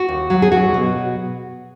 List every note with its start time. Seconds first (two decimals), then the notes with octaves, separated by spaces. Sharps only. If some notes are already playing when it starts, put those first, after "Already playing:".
Already playing: F#4
0.09 D#2
0.30 F#3
0.42 G#4
0.51 F#3 F#4
0.74 B2